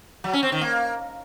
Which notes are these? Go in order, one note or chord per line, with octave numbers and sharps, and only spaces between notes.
F#3
C#4
C4
D#3
A#3